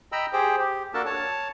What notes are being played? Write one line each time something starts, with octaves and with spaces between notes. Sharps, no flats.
D#5 G5 A#5 B5 E6
G4 G#4 C5 G5
G4
A#3 D4 F#4 A4 A#4 A5
C#5 A5